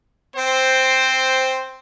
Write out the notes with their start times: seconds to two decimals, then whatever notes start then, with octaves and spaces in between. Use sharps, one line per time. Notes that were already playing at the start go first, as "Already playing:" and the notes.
0.36 C4 C5